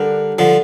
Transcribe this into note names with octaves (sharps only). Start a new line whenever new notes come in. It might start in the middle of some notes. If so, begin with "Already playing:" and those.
Already playing: D3 G3 D4 G4 A#4
D3 F3